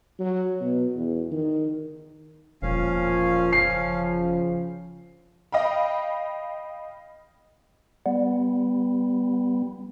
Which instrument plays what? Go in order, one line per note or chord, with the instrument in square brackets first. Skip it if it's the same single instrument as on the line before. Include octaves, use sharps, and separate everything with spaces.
[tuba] F#3
B2
E2
D#3
[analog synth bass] E1 [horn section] A#2 F3 [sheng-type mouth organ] C#4 F5
[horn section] C#3 F3 [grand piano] C7
[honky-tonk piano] D#5 F5 G5 B5
[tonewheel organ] G3 B3